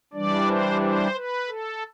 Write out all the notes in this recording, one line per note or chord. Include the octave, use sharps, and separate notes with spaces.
E3 G3 D4 D5
C5
C5
B4
A4